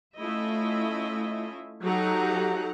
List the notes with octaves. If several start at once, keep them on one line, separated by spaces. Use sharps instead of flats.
A3 C#4 E4 F4 D#5 E5
F#3 D#4 G4 A4 F#5 A#5